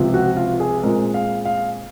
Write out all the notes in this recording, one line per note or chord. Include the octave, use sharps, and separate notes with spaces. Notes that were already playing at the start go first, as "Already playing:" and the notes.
Already playing: C#2 C3 F3
F#4
F4
G#4
A#2 G#3 C4 A#4
F5
F5